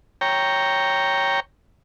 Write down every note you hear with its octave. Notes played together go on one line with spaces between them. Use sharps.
C#5 G5 A#5